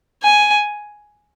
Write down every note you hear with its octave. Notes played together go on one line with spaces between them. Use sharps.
G#5